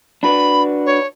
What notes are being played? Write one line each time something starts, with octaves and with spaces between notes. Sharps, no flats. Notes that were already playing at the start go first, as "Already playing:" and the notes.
D4 F#4 B4 B5
C#5